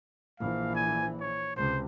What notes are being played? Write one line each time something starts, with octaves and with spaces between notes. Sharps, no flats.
A#1 E3 F5
G#5
C#5
C#2 C3 C5